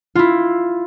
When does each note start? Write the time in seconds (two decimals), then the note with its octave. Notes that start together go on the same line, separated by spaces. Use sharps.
0.15 E4 F4